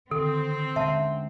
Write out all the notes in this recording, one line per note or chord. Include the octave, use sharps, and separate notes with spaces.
D3 D#3 C4 A4
D3 G#3 C#4 E5 F#5 A5